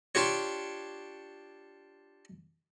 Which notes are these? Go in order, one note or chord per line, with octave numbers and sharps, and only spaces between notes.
D4 F4 G4 C#5